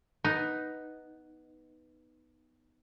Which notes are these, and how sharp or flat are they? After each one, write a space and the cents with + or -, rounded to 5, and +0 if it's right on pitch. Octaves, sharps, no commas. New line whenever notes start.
B3 +0 D#4 +0